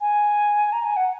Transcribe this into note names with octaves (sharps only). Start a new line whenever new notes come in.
G#5
A#5
G#5
F#5